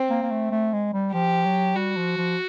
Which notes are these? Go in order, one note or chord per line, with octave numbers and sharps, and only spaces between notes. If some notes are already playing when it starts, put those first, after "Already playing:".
Already playing: C4
A#3
A#3
A3
A3
G#3
G3
F3 G4
F#3
G3 F#4
F3
F3